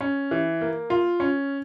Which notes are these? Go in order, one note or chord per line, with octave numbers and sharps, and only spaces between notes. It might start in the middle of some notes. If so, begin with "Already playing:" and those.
C#4
E3
A#3
F4
C#4